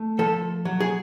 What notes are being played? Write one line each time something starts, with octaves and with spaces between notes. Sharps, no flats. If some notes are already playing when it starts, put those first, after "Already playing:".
Already playing: A3
F3 A4
F#3
G#4